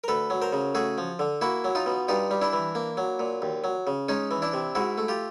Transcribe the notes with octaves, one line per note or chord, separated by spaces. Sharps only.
A#4
D2 A4 B4
F#3
A#4 C5
C#3
A3 F#4 G#4
F3
D3
A#3 E4 F#4
F#3
D#4 F4
B2
G2 D#4 F4
G3
D4 E4
E3
A#3
F#3
A#2
D#2
F#3
C#3
G#3 C#4 D#4
E3
D4 E4
C3
G#2 E4 F#4
A3
F4 G4